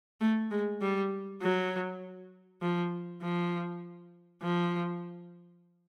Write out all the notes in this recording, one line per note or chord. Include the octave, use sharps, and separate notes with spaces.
A3
G#3
G3
F#3
F3
F3
F3